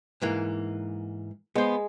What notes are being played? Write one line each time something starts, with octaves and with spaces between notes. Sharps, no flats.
G#2 E3 A#3
G#3 B3 C5